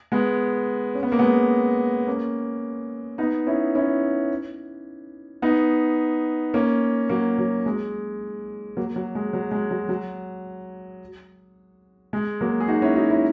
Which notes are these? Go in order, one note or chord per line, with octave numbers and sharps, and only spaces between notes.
G#3 B3
C#4
B3
A#3
G#3 B3
A#3 C#4
B3 D#4
C#4 E4
C#4 E4
B3 D#4
A#3 C#4
F#3 A#3
F#3
G#3
F#3 A#3
F#3
G#3
F#3
G#3
F#3
F#3
G#3
F#3 A#3
G#4
D#4 F#4
C#4 E4
D#4 F#4
C#4 E4